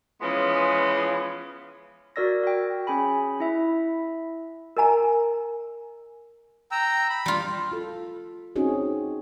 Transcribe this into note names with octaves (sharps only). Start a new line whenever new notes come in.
E3 F3 G#3 B3 C#4
F#4 A#4 D5 E6 A#6
F#4 G5
C#4 G#4 G#5 B5
E4 E5
A#4 D#5 G#5 A#5
G5 A#5 E6
B5
G3 F4
F4 A4
C4 C#4 D#4 F#4 G#4